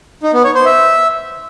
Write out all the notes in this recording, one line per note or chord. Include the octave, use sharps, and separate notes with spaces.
D#4
B3
C#5
C5
E5